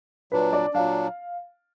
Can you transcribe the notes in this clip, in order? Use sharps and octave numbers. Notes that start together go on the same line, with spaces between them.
A#2 F#3 D4 B4
D5
A#2 F#3 D4 F5